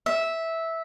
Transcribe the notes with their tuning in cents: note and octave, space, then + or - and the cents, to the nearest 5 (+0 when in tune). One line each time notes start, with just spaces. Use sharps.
E5 -10